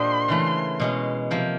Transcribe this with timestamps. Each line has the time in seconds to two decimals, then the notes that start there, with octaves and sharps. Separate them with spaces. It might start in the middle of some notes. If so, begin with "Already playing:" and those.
Already playing: A#2 A#3 D4 G4 C5 D#5 C6
0.28 C#3 E3 A3
0.80 B2 G#3 C#4
1.31 C3 F3 A#3